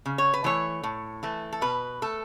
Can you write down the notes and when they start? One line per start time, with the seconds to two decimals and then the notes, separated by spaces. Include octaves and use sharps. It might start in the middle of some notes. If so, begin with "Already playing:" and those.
0.06 C#3
0.18 C#5
0.34 B4
0.44 E3 A3 C#5
0.83 A2
1.23 E3 A3
1.53 A4
1.61 B2 B4
2.02 A3 A4